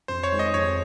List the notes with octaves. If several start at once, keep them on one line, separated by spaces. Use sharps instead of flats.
F2 C5
C#5
D#3 G#3
D#5
F2 C#5